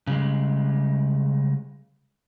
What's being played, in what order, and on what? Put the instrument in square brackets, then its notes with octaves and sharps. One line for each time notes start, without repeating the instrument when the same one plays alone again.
[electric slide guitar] C#3 G3 G#3